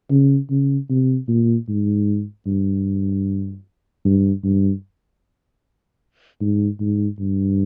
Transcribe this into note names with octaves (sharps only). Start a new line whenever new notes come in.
C#3
C#3
C3
A#2
G#2
G2
G2
G2
G#2
G#2
G2